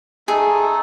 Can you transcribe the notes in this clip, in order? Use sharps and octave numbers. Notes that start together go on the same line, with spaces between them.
A3 D#4 G#4 A4